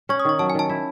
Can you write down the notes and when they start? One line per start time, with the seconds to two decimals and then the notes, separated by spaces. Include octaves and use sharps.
0.09 C#4 C#6
0.20 D#6
0.25 D#3 C#6
0.39 F#3 A5
0.50 G#5
0.55 D#3 A5
0.69 E4